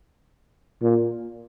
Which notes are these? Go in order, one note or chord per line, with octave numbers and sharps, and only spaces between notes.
A#2